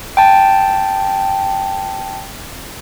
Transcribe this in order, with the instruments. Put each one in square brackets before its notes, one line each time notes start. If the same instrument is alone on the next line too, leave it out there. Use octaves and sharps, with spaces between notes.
[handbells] G5 A5